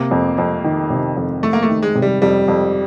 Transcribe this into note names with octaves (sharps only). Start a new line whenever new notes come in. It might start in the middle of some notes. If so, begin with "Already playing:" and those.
Already playing: C3 A#3
F2
F2
D#3
C3
F2
F2 A3
A#3
A3
D#3
G#3
C3
G3
F2 G3
F2